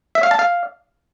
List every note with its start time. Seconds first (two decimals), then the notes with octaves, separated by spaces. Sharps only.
0.15 E5
0.23 F5
0.31 A5
0.39 F5